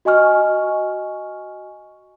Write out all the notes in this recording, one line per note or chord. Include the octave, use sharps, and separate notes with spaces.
F#4 D#5 G#5 C#6 F6